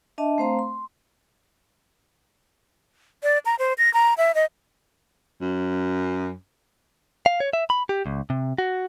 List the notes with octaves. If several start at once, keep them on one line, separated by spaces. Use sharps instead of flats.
D4 D#5 E5 A5
A3 C4 C5 F5 A#5 C6
C6
D5
A#5
C5
A#6
A#5
E5
D#5
F#2
F5
C#5
E5
B5
G4
C#2
C3
F#4